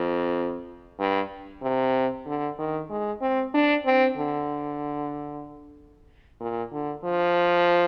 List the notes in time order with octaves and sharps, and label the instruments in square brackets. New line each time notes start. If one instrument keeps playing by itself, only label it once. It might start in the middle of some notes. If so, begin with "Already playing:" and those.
Already playing: [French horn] F2
G2
C3
D3
D#3
G#3
C4
D4
C4
D3
A#2
D3
F3